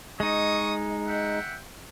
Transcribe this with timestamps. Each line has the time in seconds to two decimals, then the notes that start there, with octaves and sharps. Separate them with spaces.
0.20 G#3 D#4 C#6 D#6
1.08 E5 F#5 G5